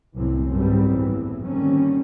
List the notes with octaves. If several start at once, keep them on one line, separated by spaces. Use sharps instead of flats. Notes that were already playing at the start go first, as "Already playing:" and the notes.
C2 F#2 A2 E3 F#3 C4
G#1 F#2 A2 G3 B3 C4
A2 E3
D3 D#3 G3 A#3 C4 C#4